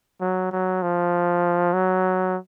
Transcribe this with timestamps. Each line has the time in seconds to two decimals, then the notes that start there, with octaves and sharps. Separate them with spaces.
0.21 F#3
0.51 F#3
0.82 F3
1.73 F#3